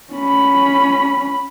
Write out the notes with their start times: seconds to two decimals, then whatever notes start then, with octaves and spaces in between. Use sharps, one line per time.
0.13 C#4 B5